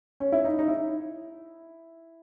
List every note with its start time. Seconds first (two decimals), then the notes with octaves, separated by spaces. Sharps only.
0.20 C#4
0.32 E4
0.45 D#4
0.59 D#4
0.68 E4